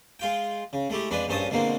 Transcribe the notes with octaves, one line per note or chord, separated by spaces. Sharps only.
G#3 F4 G5
C#3
G#3 A3 E4 G4
F2 G#3 D4 B4 D#5
A#1 G2 C#4 C5 A5 D#6
B2 D3 G#3 A#3 C4